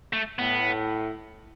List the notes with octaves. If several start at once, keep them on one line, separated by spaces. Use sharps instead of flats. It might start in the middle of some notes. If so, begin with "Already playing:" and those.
A3
A2 B3